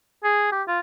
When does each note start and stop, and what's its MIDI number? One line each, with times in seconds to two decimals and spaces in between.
0.24 0.47 68
0.52 0.63 67
0.68 0.80 65